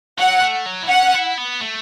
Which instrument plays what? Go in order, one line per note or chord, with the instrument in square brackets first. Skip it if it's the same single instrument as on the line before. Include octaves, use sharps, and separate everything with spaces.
[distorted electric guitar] F#3 [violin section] F#5
[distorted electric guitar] A3
F#3
E4
[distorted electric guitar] C#4 [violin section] F#5
[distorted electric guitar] E4
B3
A3